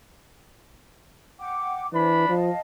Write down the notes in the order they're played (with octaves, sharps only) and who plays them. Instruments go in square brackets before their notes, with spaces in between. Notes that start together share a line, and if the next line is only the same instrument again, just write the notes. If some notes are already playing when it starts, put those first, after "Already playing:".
[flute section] F#5 G5 D6
[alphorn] E3 [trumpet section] D4 B5 [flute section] C5
[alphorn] F3 [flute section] D#5 F5 A5